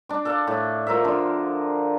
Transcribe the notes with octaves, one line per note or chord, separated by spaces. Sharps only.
D4 D6
A4 D5 F5
A2
F4 A#4 C5 E5
D3 F3